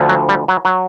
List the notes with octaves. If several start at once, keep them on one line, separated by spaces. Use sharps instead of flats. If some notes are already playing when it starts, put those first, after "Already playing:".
Already playing: D2 D3 F3
F#3
G3
F#3
F#3